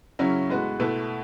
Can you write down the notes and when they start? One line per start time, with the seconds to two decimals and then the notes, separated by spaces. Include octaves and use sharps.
0.19 C#3 F#3 C#4 E4
0.50 A2 G#3 B3 F#4 B4
0.80 B2 A3 E4 B4